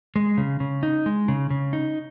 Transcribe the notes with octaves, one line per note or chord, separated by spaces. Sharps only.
G#3
C#3
C#3
D#4
G#3
C#3
C#3
D#4